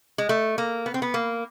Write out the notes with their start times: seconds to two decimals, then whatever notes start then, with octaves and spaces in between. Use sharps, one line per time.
0.18 G#3
0.29 A3
0.58 A#3
0.86 B3
0.94 C4
1.02 B3
1.14 A#3